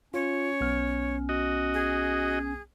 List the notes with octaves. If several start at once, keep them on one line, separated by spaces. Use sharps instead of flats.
C#4 F4 C#5
B1 B3 F6
F#4 D#5
G#4